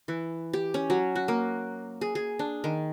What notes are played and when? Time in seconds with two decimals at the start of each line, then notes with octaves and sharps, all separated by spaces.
0.08 E3
0.53 G4
0.74 C#4
0.90 F#3
1.16 F#4
1.28 A#3
2.01 G#4
2.15 G#4
2.39 D4
2.64 D#3